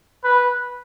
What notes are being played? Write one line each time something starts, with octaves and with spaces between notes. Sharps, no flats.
B4